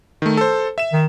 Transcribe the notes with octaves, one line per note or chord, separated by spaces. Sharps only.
D#3 A3
A4 C5
E5 E7
D#3